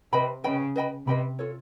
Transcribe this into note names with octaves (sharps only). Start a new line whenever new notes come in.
C3 B4 D#5 G5 B5
C#3 B4 D#5 G5 B5
B4 D#5 G5 B5
C3 B4 D#5 G5 B5
F4 A4 C#5